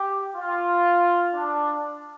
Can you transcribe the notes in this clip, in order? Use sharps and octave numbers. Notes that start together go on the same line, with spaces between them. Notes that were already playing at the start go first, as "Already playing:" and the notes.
Already playing: G4
F4
D4